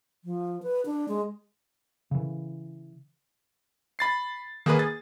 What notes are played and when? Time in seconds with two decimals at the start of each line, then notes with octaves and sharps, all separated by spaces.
0.24 F3
0.63 B4
0.86 D4
1.08 G#3
2.11 C#3 E3
3.99 B5 A6 C7
4.66 D#3 A#3 G#4 B4
4.79 G#4 A6